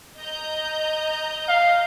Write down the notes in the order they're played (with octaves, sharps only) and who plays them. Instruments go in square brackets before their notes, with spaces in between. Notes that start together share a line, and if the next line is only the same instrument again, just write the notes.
[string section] D#5 A#5 G6
[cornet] F5